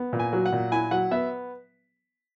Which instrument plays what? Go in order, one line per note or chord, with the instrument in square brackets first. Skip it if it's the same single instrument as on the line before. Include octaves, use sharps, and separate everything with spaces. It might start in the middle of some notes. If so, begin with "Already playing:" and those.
Already playing: [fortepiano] B3
A#2
G#5
F#3
F#5
A#2
E4 G#5
F#3 F#5
B3 E5